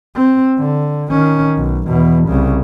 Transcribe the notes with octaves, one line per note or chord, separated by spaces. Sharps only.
C4
D3
D#3 C#4
B1
E2 B2
C2 C#3